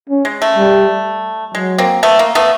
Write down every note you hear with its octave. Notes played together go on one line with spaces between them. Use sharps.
C#4
G#3
A3
G3
F#3 G#3
A#3 C4
A3 B3
A#3
A3 B3